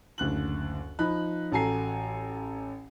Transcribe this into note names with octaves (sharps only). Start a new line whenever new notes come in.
F#1 D2 F#6 F#7
F3 D#4 B5 F#6
A1 F#4 A4 G#5 A#5 C7